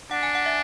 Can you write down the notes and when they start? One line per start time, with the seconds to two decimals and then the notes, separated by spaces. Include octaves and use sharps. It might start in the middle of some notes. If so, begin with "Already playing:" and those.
0.11 D4 F#5
0.23 G#5
0.35 F#5
0.46 E5